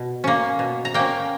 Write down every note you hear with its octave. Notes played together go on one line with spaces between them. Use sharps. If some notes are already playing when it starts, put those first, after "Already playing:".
Already playing: B2
A#3 C#4
B2
A#5
A#3 C#4 G5